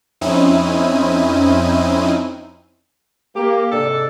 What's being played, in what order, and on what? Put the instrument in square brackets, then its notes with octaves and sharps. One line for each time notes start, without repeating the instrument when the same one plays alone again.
[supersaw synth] F2 C4 C#4 D#4 E4 D#7
[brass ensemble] A#3 [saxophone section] G4
[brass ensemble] G#2 D4 D5 [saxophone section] C3 A4